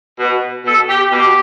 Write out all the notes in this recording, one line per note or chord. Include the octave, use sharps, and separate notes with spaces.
B2
B2 A4
G4
B2 G4